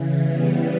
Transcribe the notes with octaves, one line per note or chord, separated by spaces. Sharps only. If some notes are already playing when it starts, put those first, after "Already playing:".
Already playing: C#3 E3
G3 B3